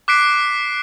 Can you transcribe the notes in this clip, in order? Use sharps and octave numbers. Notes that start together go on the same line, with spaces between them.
D6 F#6 B6 C7 D7